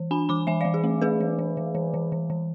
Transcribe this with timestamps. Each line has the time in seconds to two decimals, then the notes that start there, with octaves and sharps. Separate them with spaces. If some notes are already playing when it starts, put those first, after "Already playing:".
Already playing: E3
0.11 D4 G#5 B5
0.29 E3 B5 D6
0.47 E3 E5 G#5
0.61 D5 F5
0.65 E3
0.74 G#4
0.84 A3
1.02 A3 G#4 B4
1.21 E3
1.39 E3
1.57 E3
1.75 E3
1.94 E3
2.12 E3
2.30 E3